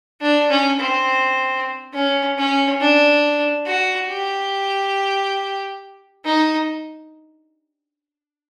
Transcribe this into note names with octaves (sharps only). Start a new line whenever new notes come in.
D4
C#4
C4
C#4
C#4
D4
F#4
G4
D#4